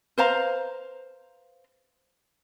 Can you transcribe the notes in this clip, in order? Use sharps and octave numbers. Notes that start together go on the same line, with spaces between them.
B4 C5 F5 A#5